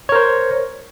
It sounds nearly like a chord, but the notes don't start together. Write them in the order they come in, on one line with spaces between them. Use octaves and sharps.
C#5 A#4 C5